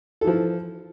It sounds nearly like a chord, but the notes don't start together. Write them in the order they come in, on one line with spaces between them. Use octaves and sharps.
A4 E3 F3